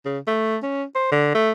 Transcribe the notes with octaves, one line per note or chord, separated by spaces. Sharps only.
C#3
A3
C#4
C5
D3
A3